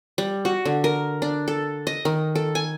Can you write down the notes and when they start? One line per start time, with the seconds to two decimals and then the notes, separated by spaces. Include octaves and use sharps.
0.18 G3
0.45 F#4
0.65 D3
0.84 A#4
1.22 D4
1.48 A4
1.87 D#5
2.05 D#3
2.35 A4
2.55 G#5